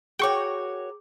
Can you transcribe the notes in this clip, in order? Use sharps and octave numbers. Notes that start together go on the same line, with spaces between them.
F#4 G#4 A#4 C#5 G5 C#6 D6